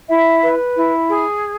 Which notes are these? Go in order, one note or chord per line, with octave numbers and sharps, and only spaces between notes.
E4 E5
B4
E4
G#4